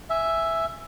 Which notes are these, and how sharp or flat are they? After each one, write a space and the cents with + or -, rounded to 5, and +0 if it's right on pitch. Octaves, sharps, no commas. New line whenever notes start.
E5 +0 G#5 +0